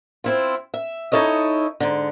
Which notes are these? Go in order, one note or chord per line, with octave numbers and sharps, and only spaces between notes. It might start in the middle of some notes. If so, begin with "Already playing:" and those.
C4 E4 F4
E5
D#4 E4 A4 C#5 D#5
G#2 D3